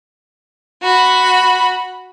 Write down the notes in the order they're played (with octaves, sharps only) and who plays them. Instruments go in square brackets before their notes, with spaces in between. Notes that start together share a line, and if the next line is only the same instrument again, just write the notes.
[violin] F#4 B5